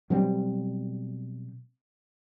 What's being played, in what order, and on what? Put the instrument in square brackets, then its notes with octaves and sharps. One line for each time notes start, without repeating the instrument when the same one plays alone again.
[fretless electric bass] B2 F#3 G3 C4